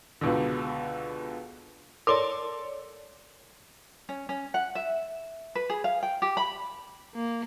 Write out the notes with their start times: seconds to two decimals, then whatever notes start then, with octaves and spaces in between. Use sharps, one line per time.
0.21 C#2 B2 D3
2.07 A4 A#4 C#5 D5 C6 D6
4.09 C#4
4.29 C#4
4.54 F#5
4.75 E5
5.55 B4
5.70 G#4
5.84 F5
6.03 G5
6.22 G4
6.37 B5
7.15 A#3